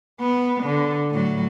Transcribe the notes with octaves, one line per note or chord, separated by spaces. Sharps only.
B3
D3
A2 F#3